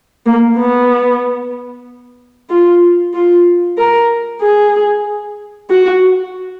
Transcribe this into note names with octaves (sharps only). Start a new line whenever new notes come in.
A#3
B3
F4
F4
A#4
G#4
F#4